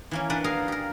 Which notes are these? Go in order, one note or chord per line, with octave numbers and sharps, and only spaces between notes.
E3 A#3 C#4
D4 G4 B4 D5 F#5
G#4 A#4 F5
G4 A#4